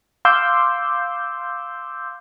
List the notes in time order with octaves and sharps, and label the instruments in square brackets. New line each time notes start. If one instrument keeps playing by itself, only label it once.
[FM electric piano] F5 C6 D6 E6 G6